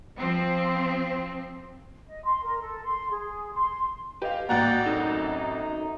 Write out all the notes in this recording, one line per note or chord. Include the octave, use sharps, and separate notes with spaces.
F3 C4
D#5
C6
A#4
A4
C6
G#4
C6
G4 B4 D#5 F5
A1 A#3 F#4 D5 F#5 G5 A#5
F#2 C4 D#4 A4